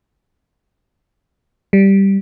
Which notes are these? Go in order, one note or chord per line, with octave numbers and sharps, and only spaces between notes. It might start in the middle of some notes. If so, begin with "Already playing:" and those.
G3